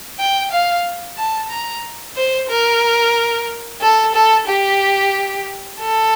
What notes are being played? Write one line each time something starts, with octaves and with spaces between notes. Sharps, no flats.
G5
F5
A5
A#5
C5
A#4
A4
A4
G4
A4